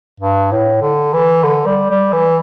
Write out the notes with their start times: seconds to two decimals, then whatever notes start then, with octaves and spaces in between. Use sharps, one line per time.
0.20 G2
0.52 A2
0.81 D3
1.13 E3
1.43 D3
1.66 G3
1.90 G3
2.13 E3